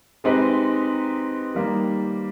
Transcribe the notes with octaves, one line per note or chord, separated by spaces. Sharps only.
G#3 C4 D#4 G4 B4
D#3 G3 A#3